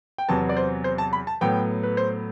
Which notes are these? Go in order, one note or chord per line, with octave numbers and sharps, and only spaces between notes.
G5
E2 C3 F#3 B3 A5
D5
C5
C5
A5
B5
A5
A2 F#3 B3 G5
B4
C5